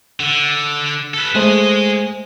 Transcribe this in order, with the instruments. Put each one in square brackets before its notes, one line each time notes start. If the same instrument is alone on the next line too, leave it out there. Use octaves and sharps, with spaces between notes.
[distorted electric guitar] D3
A4 B4
[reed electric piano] G#3 A3 C5 [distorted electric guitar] G#4 D#5